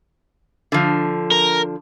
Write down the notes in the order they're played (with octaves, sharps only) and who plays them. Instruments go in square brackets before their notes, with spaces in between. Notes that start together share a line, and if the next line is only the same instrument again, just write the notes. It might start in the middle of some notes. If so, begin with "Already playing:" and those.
[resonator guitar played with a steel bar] D3 F3
[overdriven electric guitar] A#4